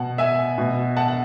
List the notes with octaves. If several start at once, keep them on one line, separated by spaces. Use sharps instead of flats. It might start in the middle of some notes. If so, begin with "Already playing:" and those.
Already playing: B2 F#5 A5
E5 G#5
B2
F#5 A5
F#5